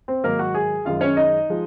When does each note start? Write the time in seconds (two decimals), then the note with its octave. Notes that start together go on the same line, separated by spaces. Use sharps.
0.08 C4 C5
0.23 G#2 D#3 F#3 A#3 A#4
0.39 F#4 F#5
0.54 G#4 G#5
0.85 F#2 D#3 G#3 F4 F5
1.01 C#4 C#5
1.17 D#4 D#5
1.50 F3 G#3